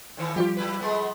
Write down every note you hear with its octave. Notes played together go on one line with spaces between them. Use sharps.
A2 D#3 E3
F3 G3 F4 G4
F#3 E4 B4
G#3 A3 B3